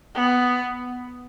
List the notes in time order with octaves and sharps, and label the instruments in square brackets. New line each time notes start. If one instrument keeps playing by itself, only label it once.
[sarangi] B3